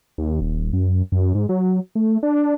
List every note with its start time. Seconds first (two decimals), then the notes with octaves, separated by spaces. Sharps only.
0.18 D#2
0.41 D#1
0.73 F#2
1.12 F#2
1.35 G#2
1.49 F#3
1.95 A3
2.23 D4